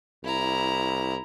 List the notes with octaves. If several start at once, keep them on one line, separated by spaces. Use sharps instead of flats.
C2 E4 A#5